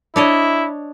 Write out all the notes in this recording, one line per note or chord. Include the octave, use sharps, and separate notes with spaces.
D4 E4 C#5 D#5